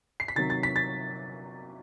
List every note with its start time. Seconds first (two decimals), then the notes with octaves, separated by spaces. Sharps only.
0.20 C7
0.28 B6
0.36 C3 D#3 F#3 A6
0.50 A6
0.63 B6
0.76 A6